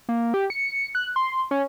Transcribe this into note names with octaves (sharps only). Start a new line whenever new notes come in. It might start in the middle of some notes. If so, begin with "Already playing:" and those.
A#3
G4
C#7
F#6
C6
C#4